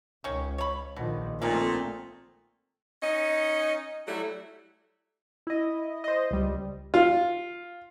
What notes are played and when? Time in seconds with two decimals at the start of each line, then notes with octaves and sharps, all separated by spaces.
0.24 C#2 D#3 C#4
0.58 C#5 B5
0.96 A#1 B2 D#3 F3
1.42 A#2 F3 G#3 A3 C4 D4 D#4
3.03 C#4 D#4 D#5
4.07 F#3 G3 A3 E4 F#4
5.47 E4 D#5
6.04 C5 D#5
6.31 C#2 G3
6.94 F4